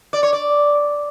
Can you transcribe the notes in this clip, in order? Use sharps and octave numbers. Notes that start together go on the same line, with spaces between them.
D5
C#5
D5